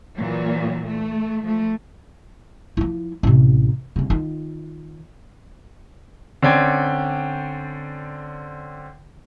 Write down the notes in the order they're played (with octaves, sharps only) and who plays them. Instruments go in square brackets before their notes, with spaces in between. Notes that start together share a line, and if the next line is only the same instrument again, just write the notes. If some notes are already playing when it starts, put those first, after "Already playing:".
[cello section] A#2 E3 F#3
A3
F3 A3
[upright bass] F3 E4
A1 C3
C2 C#3
D#3 F4
[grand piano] D3 C4 C#4 D5 G5 G#6